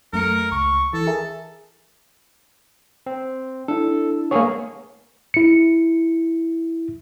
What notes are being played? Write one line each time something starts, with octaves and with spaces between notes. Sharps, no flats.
F#2 A3 A#4 C#7
C#2 C#6
E3 A4
G#4 A#4 E5
C4
D4 E4 A4
A#3 B3 G#4 A4 C#5
E4 C#7